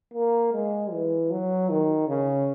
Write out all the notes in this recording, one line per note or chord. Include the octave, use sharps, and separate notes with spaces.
A#3
G#3
E3
F#3
D#3
C#3